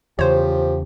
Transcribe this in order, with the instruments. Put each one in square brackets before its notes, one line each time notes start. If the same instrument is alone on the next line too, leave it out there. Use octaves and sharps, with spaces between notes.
[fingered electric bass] E2 C#3 [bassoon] F3 [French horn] G4 [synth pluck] C5 C#5